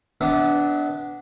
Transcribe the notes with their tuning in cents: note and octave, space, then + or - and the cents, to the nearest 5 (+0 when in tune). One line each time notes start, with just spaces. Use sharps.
B3 +10 D4 -10 E5 -35